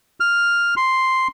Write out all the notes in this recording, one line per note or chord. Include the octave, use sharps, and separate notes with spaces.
F6
C6